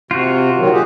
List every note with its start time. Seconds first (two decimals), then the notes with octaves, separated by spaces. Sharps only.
0.11 C3 F4 F#4
0.57 A#2 D#3 F#3
0.72 G4 G#4